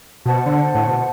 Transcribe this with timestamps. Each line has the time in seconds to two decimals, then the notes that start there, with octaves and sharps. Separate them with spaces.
0.25 B2 C5 F#5 A5
0.46 D3
0.75 A2
0.86 B2